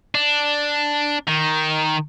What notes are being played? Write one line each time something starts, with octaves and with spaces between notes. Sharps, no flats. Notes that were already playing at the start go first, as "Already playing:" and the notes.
D4
D#3